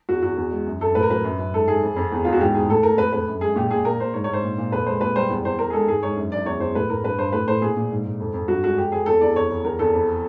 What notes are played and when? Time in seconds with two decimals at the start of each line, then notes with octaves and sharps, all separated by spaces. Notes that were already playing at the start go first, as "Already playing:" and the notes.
0.09 E2 F#4
0.22 E2 F#4
0.37 E2
0.51 G#3
0.66 F#2
0.81 F#2 A4
0.95 A2 B4
1.03 A#4
1.10 F#3 B4
1.24 F#2
1.39 F#2
1.54 G#2 A4
1.68 G#2 G#4
1.83 F2
1.96 F2
2.12 E2
2.25 E2 F4
2.33 F#4
2.41 G#2 G4
2.54 G#2 G#4
2.69 A2 A4
2.83 A2 A#4
2.98 F2 B4
3.13 F2 B4
3.28 F#2
3.41 G#3 G#4
3.56 A#2 G4
3.71 A#2 G#4
3.85 A#2 A#4
4.00 A#2 C5
4.14 G#2 C#5
4.24 C#5
4.28 G#2
4.33 C5
4.44 A#2
4.58 A#2
4.72 F2 B4
4.86 G#3 C5
5.01 A#2 B4
5.16 G3 C5
5.29 E2
5.45 E2 C5
5.59 F2 A#4
5.70 G#4
5.73 G#3 A4
5.88 G#2 G#4
6.03 G#2 C#5
6.16 F#2
6.32 F#2 D5
6.45 E2 C#5
6.60 E2 C5
6.75 A2 B4
6.90 A2 A#4
7.03 G2 B4
7.18 G2 C5
7.33 A2 B4
7.48 A2 C5
7.62 A#2 G#4
7.77 A#2
7.91 G#2
8.05 G#2
8.20 F2
8.34 F2
8.48 G2 F#4
8.64 G#3 F#4
8.77 F2 G4
8.92 F2 G#4
9.06 E2 A4
9.21 E2 D5
9.35 F2 C#5
9.50 F2
9.64 E2 A#4
9.79 E2 A4
9.94 F2